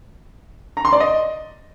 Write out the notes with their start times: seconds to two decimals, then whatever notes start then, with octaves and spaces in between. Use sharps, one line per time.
0.77 A#5
0.85 C6
0.93 D5
1.00 D#5